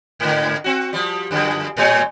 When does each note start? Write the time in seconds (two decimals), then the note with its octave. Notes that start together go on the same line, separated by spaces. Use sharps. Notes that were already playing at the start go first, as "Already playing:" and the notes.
0.20 G#2 D3
0.64 C4 F#4
0.93 F3 G3
1.31 F#2 D3 F3
1.77 A2 G3 C#5